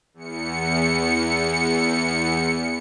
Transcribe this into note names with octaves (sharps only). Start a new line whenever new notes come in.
E2 C#7